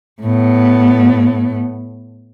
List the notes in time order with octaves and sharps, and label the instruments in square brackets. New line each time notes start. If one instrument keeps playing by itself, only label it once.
[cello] A2 B3